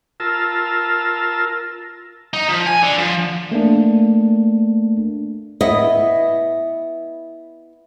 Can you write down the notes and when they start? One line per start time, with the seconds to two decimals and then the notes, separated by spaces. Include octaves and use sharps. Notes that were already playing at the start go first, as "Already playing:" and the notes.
0.20 F4 A#4 A5 E6
2.33 D#4
2.48 F3
2.66 G#5
2.83 D3
2.98 F3
3.52 A3 A#3 D4
5.61 B3 E4 D#5